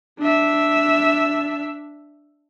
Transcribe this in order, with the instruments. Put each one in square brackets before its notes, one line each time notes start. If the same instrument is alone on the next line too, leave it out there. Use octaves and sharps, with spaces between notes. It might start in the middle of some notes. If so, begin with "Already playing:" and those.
[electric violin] D4 E5